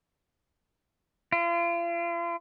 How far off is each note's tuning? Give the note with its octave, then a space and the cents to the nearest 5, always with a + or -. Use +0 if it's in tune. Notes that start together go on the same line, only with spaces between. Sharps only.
F4 -40